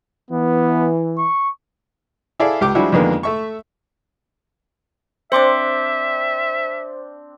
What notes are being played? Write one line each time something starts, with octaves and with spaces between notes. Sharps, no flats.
E3 B3
C#6
E4 G#4 A4 D5 E5 F5
C#2 G4 D6
F3 G3 G#3 D4 E4 F#4
F2 D3 D#3 G#3 A#3 B3
A3 E5 C#6
C4 D4 C5 E5 C6 D6